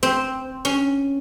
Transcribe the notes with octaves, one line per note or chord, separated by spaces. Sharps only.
C4
C#4